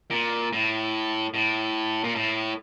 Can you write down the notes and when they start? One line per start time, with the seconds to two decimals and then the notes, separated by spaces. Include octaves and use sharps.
0.11 A#2
0.53 A2
1.34 A2
2.04 A#2
2.15 A2